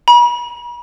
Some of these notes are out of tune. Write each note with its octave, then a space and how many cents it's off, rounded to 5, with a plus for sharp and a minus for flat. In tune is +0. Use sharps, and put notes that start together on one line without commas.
B5 -45